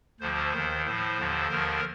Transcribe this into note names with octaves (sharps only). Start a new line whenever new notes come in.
D2 D3 F3 C5
D#2 D#3
A2 F3 C5
D#2 D3 F3
D#2 D3 F3 A#4